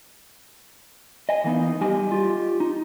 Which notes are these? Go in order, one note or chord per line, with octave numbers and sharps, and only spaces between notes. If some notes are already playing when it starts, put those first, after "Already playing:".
D#5 G#5
E3 A#3 B3 D#4
G3 G4 D#5 G#5
F4 G4
D#4